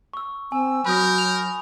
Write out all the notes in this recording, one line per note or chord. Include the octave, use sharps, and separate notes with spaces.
C#6 E6
C4 G#5 E6
F#3 A#4 B5 D#6 G6
F7